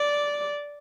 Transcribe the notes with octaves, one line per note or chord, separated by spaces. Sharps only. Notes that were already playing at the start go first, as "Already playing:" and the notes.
Already playing: D5